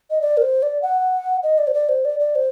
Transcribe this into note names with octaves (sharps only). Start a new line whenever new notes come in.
D#5
D5
A#4
C5
D5
F#5
D#5
D5
C5
D5
C5
D5
D5
C5